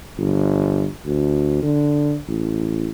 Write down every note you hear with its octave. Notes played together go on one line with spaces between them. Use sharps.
G1
D2
D3
A1